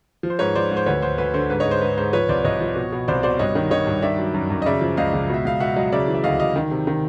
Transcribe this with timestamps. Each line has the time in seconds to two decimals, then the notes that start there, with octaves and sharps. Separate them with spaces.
0.23 F3
0.30 C5
0.39 G#2 B4 C#5
0.55 F3 C5 D5
0.71 G#2
0.77 C5
0.86 D2 B4 C#5
1.02 D2 C5
1.18 D2 B4
1.34 D3 C5
1.50 G#2 B4
1.60 C#5 D#5
1.65 G#2
1.71 C5
1.81 G#2 B4
1.97 G#2 C5
2.13 F3 B4 C#5
2.29 C2 C5 D5
2.45 C2 C#5 D#5
2.61 F3
2.76 B2
2.92 B2
3.08 C2 C5 D5
3.23 B2 C5 D5
3.39 G2 C#5 D#5
3.55 D#3
3.71 D#3 C#5 D#5
3.87 G2
4.02 D#3 D5 E5
4.19 F#3
4.34 F#2
4.50 F#2
4.62 D#5
4.66 C#3 D5 E5
4.81 F3
4.97 C#2 D#5 F5
5.14 C#2
5.29 B2 E5
5.45 C#2 F5
5.60 B2 E5 F#5
5.76 F#3 D#5 F5
5.92 C#3 D5 E5
6.08 E3
6.14 E5
6.24 D2 D#5 F5
6.39 D2 D#5 F5
6.56 D#3
6.71 C3
6.87 D#3